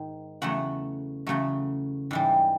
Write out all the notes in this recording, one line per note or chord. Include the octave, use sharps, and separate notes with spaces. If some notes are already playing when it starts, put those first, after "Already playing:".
Already playing: G#2 D#3
E2 C#3 F#3 A3 F#5
E2 C#3 F#3 A3
G#2 E3 G3